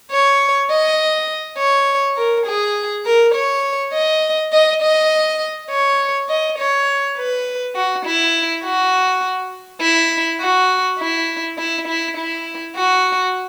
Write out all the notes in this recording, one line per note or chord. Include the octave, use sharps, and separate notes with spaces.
C#5
D#5
C#5
A#4
G#4
A#4
C#5
D#5
D#5
D#5
C#5
D#5
C#5
B4
F#4
E4
F#4
E4
F#4
E4
E4
E4
E4
F#4